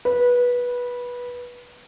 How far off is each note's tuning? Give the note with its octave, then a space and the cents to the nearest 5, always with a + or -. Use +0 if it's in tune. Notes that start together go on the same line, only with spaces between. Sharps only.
B4 -15